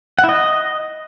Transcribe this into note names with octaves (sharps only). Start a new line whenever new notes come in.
F#5
E4
D#5